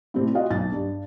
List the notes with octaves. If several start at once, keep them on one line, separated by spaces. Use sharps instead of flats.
A2 C3 G3 C4
F4 F#4 D#5 F5
B1 A6
G2